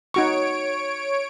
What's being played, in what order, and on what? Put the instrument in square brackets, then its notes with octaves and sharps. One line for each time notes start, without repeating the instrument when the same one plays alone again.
[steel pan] D#4 F#4 C#6 [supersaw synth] C#5 D7